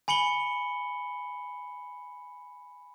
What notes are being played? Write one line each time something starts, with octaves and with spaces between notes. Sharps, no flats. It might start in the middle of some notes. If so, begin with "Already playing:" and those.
G#5 B5 C#7 F#7 G7